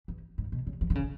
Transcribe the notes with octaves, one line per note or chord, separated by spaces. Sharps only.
E3
G#2
B2
C#3
E3
D3
C#3